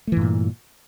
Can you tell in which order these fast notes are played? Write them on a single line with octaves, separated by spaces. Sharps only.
A3 E3 G2 A#2